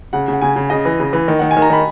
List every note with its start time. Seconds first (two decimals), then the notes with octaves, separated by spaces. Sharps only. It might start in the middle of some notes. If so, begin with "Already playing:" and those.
0.13 C#3 F#5
0.28 C#3 F#5
0.41 C#3 G#5
0.56 C#3
0.70 C#3 D#5
0.85 E3
1.00 C#3
1.13 E3
1.28 D#3
1.39 D#3 F#5
1.51 G#5
1.57 D#3
1.62 A#5
1.70 D#3 B5